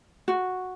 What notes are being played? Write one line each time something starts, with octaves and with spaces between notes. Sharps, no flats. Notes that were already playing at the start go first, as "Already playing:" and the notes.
F#4